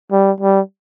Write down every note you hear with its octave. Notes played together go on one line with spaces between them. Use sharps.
G3
G3